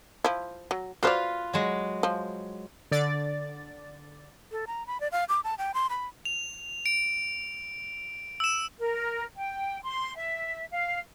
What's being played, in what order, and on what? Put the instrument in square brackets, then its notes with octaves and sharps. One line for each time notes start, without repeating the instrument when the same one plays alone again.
[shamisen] F3 E4
F#3
[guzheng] F4 B4 F5 [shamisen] F#4 C5 D5
[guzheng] F#3 G#3
[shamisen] F3
[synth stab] D3 D5 A6
[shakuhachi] A4
A#5
B5
D5
F5
D6
A5
G5
C6
B5
[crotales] F7
D7
E6 E7
[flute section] A#4
G5
C6
E5
F5